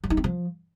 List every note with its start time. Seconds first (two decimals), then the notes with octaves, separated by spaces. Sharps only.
0.04 F#3
0.10 D#4
0.17 C4
0.24 F3